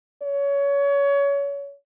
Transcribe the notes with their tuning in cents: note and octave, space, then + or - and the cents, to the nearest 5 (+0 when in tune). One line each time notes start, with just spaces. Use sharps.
C#5 +25